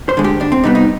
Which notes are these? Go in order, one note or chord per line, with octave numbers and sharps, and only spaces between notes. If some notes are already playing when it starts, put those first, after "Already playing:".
C5
D3 G#3
G4
D2 D4
C4
C3 G3 B3 D#4
D#4